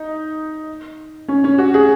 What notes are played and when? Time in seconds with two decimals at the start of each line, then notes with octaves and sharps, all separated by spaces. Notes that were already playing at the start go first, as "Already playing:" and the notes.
Already playing: D#4
1.28 C#4
1.44 C#4
1.58 F#4
1.74 G#4